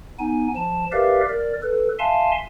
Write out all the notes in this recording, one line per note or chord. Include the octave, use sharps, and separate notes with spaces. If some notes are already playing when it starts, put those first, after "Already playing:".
B3 D#4 G#5
F3 A5
G4 A#4 B4 D5 E5 F5
A#4 D5
A4 B4
E5 F5 G#5 A5 C6